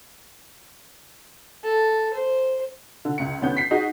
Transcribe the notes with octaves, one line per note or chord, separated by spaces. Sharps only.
A4
C5
D3
C#2 C#7
D2 B3 C#4 G6
B6 C7
D#4 F#4 G#4 D#5